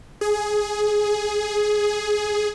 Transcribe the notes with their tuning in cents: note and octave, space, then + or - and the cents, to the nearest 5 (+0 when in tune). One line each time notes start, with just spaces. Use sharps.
G#4 +10